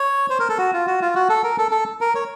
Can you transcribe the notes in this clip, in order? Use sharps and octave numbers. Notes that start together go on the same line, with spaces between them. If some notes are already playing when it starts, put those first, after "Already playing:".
Already playing: C#5
C5
A#4
A4
F#4
F4
F#4
F4
F#4
A4
A#4
A4
A4
A#4
C#5